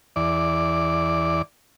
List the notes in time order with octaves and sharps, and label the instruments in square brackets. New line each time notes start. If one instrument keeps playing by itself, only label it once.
[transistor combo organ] E2 D5